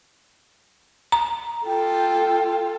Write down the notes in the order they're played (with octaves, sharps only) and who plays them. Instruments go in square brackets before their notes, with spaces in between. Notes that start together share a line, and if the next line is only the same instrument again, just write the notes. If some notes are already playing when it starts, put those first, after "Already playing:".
[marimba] A#5
[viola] F4 A4 [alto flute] G5